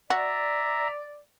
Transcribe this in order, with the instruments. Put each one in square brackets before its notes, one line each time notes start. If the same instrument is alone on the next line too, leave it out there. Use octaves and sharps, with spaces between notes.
[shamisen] F#4 [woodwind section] D5 [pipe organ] E5 A#5